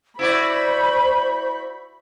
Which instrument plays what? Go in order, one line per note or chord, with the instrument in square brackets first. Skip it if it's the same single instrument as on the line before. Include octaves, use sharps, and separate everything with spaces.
[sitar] E4 F#4 D5 [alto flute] C5 [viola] B5 C#6